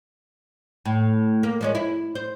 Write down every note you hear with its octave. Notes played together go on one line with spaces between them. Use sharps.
A2
A#3
F3 G#3 C#4
E4
C5